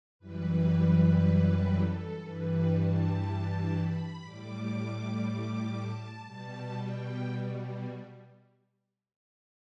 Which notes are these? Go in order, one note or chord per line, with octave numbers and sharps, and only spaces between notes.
F#2 E3 G3 B4
A4
G2 E3 G3 B4
A5
B5
A2 G3 D6
A5
B2 G3 A5
G5